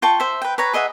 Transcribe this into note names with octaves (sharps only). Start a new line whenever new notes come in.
F4 G5 A5 C#6
C5 E5
B4 G5
B4 C#5 A#5
G#4 D#5 E5 F#5